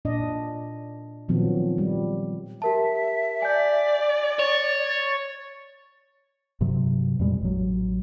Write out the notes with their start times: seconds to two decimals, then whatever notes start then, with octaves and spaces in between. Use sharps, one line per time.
0.05 A#2 D4 D5 D#5
1.29 A#2 D#3 F3 F#3 B3 C4
1.78 G3
2.62 G4 A#4 E5 A5
3.42 D5 G#5 G6
4.39 C#5 A6
6.61 G2 C3 F#3
7.19 F2 A#2 G3 G#3
7.41 A1 F#3